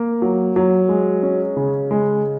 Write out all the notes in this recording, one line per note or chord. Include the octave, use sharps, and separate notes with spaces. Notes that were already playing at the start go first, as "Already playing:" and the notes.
Already playing: A#3
F#3
F#3
G#3
C#4
C#3
G#3